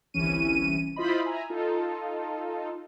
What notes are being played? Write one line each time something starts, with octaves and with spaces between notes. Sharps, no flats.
G1 C2 E3 C#4 D#7
E4 F4 C5 D#5 B5
E5 G#5 A#5
D#4 F4 A4